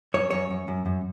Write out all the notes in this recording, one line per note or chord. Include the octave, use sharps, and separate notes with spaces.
F#2 C#5
F#2 C#5
F#2
F#2
F#2